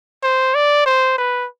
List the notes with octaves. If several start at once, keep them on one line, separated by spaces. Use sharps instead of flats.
C5
D5
C5
B4